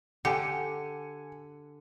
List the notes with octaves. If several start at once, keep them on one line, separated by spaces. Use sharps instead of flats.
D3 G4 G#5 C#7